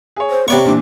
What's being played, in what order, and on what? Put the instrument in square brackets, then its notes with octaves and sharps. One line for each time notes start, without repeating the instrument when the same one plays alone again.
[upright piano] G#4 C#5
[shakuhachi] C5
[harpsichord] C3 D5 C#6 [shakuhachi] B3 [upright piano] C#5
[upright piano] C2 A#2 E3 [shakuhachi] D4